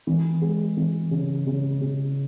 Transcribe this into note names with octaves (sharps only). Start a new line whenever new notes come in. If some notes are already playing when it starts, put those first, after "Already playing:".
E3
G#3
E3
C#3
C#3
C#3